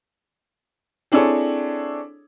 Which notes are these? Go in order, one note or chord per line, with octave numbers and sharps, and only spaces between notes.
C4 D4 E4 G#4 A4 C#5